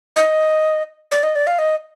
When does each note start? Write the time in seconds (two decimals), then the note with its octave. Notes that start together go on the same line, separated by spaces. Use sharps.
0.16 D#5
1.11 D5
1.23 D#5
1.35 D5
1.47 F5
1.59 D#5